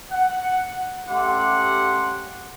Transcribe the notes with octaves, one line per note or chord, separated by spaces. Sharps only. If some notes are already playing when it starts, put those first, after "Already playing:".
F#5
A3 C#4 G4 F#5 C6 D6